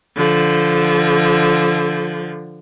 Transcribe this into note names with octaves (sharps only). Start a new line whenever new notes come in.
D3 F3